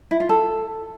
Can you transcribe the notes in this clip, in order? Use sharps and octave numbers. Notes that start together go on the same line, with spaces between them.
E4
F4
A4